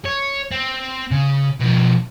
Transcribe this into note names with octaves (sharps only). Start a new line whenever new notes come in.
C#5
C4
C#3
B2 F3